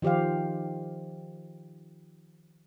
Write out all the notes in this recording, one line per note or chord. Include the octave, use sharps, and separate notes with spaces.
D#3 F3 G4 C5 F5